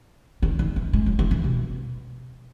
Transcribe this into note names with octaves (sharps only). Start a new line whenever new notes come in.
D#3
D#3
E3
G#3
F#3
E3
E3
B2